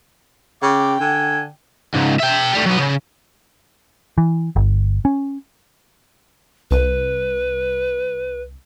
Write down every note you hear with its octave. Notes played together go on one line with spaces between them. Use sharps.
C#3 G5 D6
D3 G#5
C#2 G#2
E5 G5
A2 G3
F#3 B3
C#3
E3
G1
C#4
C2 B4